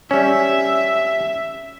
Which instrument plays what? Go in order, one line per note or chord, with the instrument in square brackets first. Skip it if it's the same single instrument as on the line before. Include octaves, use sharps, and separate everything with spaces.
[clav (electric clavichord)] G3 C#4 [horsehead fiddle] E5